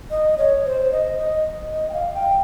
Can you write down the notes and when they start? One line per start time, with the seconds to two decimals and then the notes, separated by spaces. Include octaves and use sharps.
0.11 D#5
0.38 C#5
0.65 C5
0.92 D#5
1.19 D#5
1.74 D#5
1.90 G5
1.93 F5
2.14 G5